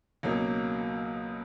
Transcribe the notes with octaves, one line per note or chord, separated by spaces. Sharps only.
C#2 B2 F#3 A#3 D#4